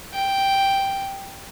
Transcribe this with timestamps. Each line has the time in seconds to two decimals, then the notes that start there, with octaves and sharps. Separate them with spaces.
0.14 G5